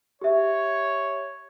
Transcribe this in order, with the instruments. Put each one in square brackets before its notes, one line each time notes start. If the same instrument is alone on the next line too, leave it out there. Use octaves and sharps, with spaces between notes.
[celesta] G4 E5 [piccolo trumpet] C#5